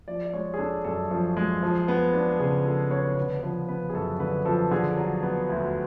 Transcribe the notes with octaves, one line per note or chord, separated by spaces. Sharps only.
F3 D5
D5
G#3 C#5
G#4
D4 A4
F#2 A4
F3
G#3
F3
B3
D4
C#3 G#4
F3 A4
B3 C#5
D3 B4
F3 B4
B3 B4
G#4
F#2 A4
D3 B4
F3 A4
D3 G#4
F#3
B3
D2